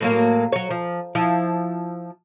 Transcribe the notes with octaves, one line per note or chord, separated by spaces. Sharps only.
A2 F#3 A#3
F#3 C#5
F3
F3 E4